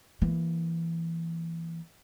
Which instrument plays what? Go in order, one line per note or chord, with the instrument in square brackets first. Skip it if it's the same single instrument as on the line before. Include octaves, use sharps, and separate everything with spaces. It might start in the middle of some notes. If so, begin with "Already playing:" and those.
[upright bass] E3 A#3